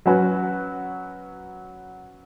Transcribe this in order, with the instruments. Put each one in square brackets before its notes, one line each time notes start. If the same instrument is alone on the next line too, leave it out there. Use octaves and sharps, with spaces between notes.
[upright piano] F#3 C#4 F#4 B4